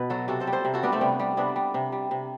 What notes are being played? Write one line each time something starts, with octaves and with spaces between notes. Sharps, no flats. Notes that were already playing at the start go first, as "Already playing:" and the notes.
Already playing: B2 B4
F#3 F#4 A4
C3 F#4 A4
A4 C5
G3
A4 C5
C3
F#4 A4
G3 B3 D4
A3 C4
C3 G3 B3
G3
C3 B3 D4
G3
C3
G3
C3